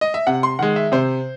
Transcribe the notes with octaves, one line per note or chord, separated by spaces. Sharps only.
D#5
E5
C3 F#5
C6
D#3 G#3 F#5
E5
C3 C5